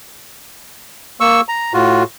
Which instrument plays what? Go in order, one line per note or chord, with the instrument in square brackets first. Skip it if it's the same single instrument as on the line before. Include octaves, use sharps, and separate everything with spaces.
[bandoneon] A#3 C#6 E6
A#5
A2 F4 F#4